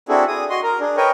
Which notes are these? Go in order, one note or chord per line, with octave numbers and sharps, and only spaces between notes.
C4 D4 E4 F#4 G#4 A4
G#4 D#6
F#4 D#5 C6
A#4 A#5
D4 G#4
A#4 B4 C#5 D#5 G5 G#5